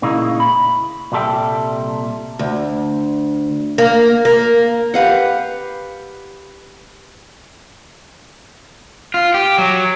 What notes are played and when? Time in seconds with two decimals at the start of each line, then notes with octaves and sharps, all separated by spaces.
0.02 A#2 C#3 G#3 A#3 D#4 E4
0.40 B5
1.12 C2 A#2 G3 A4 E5 G5
2.39 D2
3.78 A#3
4.25 A#3
4.94 G4 B4 F5 F#5
9.14 F4
9.34 G4
9.58 F#3